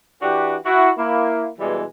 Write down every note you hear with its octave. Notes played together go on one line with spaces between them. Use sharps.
E3 D4 F#4 G4
E4 F#4
A#3 E4
B2 E3 G3 G#3